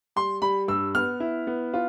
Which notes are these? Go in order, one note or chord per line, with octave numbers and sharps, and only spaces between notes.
G3 C6
G3 B5
G2 E6
B3 F6
E4
B3
F4